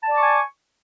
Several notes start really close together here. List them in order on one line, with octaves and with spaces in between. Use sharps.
A5 D5 D6 C#6 G#5